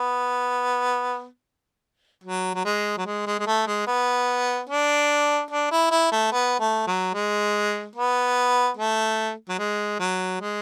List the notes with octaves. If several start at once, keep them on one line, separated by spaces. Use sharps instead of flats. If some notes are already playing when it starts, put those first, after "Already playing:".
Already playing: B3
F#3
F#3
G#3
F#3
G#3
G#3
G#3
A3
G#3
B3
D4
D4
E4
E4
A3
B3
A3
F#3
G#3
B3
A3
F#3
G#3
F#3
G#3